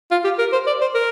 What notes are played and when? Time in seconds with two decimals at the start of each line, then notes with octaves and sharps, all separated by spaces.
0.11 F4
0.24 G4
0.39 A#4
0.52 C5
0.67 D5
0.81 C5
0.95 A#4